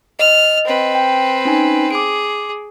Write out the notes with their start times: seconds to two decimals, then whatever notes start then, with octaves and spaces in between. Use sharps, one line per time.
0.19 D#5 F6
0.65 C4 B4
0.95 G5
1.45 C#4 D#4 G#5
1.91 G#4 D6 D7